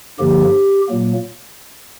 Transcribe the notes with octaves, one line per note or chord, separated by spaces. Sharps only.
G2 D3 F3 A#3 G4
A#2 F#3 A#3